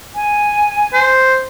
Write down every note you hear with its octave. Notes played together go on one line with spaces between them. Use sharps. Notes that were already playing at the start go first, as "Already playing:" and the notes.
G#5
C5